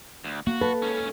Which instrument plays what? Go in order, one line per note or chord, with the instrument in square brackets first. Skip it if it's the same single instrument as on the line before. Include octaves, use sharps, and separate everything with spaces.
[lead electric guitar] D2
[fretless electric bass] A#3 [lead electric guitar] F#4
[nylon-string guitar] A4 [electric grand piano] B4
[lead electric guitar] G#2 C#4